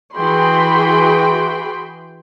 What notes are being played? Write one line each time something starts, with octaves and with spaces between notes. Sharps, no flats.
E3 F#4 G#4 G5 B5 C6